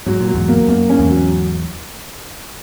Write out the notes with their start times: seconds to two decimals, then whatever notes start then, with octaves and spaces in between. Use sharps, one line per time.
0.06 G#2 F#3
0.21 A#2
0.28 F#3
0.34 E2 G#2
0.48 A#3
0.68 F#2 A#3
0.90 C#4
0.99 E2 G#2
1.09 F#3